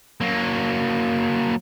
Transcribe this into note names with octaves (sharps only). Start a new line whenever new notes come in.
F#3 A#3